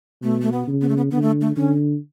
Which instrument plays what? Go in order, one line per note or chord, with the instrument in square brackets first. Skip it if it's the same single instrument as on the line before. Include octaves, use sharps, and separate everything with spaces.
[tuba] B2 [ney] A3
[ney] A3
B3
[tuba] C#3
[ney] B3
A3
B3
[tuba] D3 [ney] B3
[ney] A3
A3
[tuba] D3 [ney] C#4